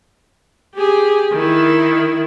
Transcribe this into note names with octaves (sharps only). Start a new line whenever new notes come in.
G4 G#4
D#3 E4